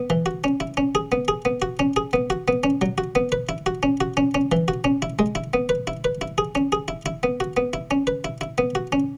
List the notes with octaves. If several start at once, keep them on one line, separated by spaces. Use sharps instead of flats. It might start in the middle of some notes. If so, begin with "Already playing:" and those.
Already playing: B3
E3
F#4
C#4
E4
C#4
G#4
B3
G#4
B3
F#4
C#4
G#4
B3
F#4
B3
C#4
F#3
F#4
B3
B4
E4
F#4
C#4
F#4
C#4
C#4
E3
F#4
C#4
E4
G#3
E4
B3
B4
E4
B4
E4
G#4
C#4
G#4
E4
E4
B3
F#4
B3
E4
C#4
B4
E4
E4
B3
F#4
C#4